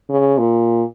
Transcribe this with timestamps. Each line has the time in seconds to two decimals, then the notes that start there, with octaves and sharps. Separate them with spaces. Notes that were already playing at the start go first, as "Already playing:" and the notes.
0.09 C#3
0.38 A#2